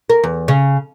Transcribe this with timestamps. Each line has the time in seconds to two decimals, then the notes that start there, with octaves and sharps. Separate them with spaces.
0.10 A#4
0.23 E2
0.48 C#3